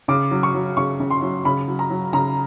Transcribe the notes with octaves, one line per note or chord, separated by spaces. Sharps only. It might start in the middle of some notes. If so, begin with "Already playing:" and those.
C#3 D6
F#3
C#6
F#3
C#3 C#6
C#3
C6
F#3
C#3 B5
F#3
A#5
F#3
C#3 A#5